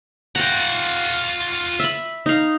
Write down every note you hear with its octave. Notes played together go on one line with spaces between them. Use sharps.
F4 F#5 G5 A#5
E5 B5
D#4 F5